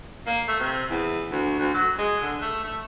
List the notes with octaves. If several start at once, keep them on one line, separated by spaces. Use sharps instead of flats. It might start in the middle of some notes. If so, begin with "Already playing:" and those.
A#3
A3
C3
E2
D2
D2
F#3
G#3
D3
A3
A3